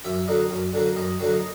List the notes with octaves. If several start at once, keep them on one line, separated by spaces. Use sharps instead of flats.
F#2 E5
D3 F#3 A#3 D#5
F#2
D3 F#3 A#3
F#2 D#5
D3 F#3 A#3
D#5